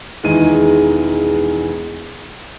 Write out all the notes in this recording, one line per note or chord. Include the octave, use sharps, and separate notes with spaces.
E1 D#3 E3 G#3 D#7